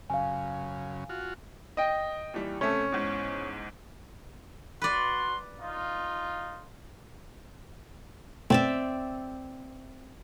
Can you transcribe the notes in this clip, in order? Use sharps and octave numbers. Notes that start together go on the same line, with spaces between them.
F#2 C#3 F5 G#5
F4 F#4
D#5 G5
D#2 E3 G3
C3 A3 C#4 A4
E2 G#2
F#4 B4 D5 C6
D#4 F4
F#2 B2 A3 C4 D5 E5